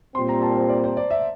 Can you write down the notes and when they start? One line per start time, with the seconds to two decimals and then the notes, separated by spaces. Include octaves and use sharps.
0.15 A#2 G3 C4 C6
0.29 A#5
0.42 A5
0.56 C5
0.69 D5
0.84 C5
0.97 D5
1.11 E5